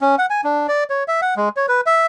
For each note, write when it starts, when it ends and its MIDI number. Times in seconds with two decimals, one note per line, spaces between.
0.01 0.16 61
0.18 0.26 78
0.30 0.41 80
0.44 0.67 62
0.68 0.84 74
0.90 1.04 73
1.08 1.21 76
1.22 1.34 78
1.37 1.49 56
1.57 1.66 73
1.68 1.81 71
1.86 2.06 76